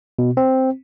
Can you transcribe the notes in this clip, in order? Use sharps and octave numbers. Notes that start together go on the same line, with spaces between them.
B2
C4